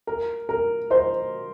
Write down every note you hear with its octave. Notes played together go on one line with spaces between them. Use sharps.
A#4
A#4
C5 D#5